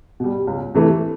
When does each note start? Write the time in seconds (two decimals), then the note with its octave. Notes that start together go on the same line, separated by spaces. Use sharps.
0.20 B2 G3
0.47 C#2
0.75 C3 E3 A3